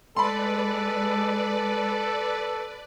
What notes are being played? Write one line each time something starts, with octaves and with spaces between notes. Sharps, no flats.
G#3 A4 B4 D5 B5 C6